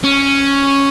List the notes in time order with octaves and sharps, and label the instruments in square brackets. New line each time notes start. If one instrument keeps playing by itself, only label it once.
[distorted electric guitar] C#4